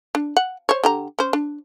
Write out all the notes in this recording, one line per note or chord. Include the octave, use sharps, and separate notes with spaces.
D4
F#5
C5 C#5
D3 G4 A#5
C#4 C5
D4